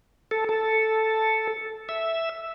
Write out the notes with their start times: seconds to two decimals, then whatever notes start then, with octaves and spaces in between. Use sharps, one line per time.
0.31 A4
0.49 A4
1.89 E5